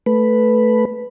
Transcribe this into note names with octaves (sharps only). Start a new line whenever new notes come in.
A3 B4